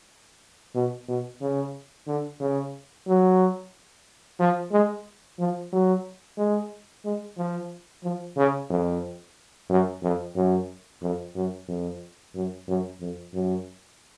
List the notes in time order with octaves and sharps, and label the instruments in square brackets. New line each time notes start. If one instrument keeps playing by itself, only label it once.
[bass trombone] B2
B2
C#3
D3
C#3
F#3
F3
G#3
F3
F#3
G#3
G#3
F3
F3
C#3
F2
F#2
F2
F#2
F2
F#2
F2
F#2
F#2
F2
F#2